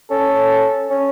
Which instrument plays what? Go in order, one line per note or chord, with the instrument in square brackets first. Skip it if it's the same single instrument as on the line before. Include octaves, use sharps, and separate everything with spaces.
[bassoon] C#4 [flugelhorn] A4
[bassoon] C#4